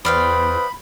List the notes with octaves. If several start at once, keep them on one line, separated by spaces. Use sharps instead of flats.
E2 B4 C5 D5 F5 G5 B5 D#6